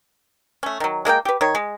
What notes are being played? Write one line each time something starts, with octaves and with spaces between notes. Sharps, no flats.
A3 C#4
D#3 F#3
G#3 A#3 A4 G5
G4 B4
D#3 C#5
G#3